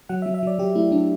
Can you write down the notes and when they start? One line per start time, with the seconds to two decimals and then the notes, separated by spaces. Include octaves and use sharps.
0.09 F#3 F#5
0.22 E5
0.26 F#3
0.34 E5
0.43 F#3 D5
0.59 F#3 G4
0.75 A3 E4
0.92 F#3 D4